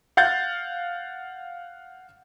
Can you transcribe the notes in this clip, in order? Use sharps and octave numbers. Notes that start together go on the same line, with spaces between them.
F5 F#5 G6 A6